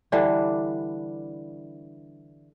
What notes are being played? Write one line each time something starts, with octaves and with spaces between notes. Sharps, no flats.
D3 E3 G3 D4